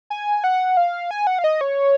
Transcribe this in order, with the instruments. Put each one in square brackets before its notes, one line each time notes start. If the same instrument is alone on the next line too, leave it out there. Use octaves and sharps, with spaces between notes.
[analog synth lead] G#5
F#5
F5
G#5
F#5
F5
D#5
C#5